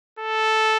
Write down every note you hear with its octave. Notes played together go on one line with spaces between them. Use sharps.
A4